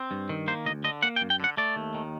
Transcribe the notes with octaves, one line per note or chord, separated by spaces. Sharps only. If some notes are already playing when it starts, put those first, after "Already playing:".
Already playing: C4
G2
D#3
A#3 C5
D2 D#5
D3 D#5
A#3 F#5
G5
F#2
G5
D3 F#5
A3 D5
D#2
D#3